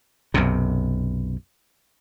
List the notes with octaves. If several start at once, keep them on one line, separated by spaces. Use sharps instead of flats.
B1 F#2 C3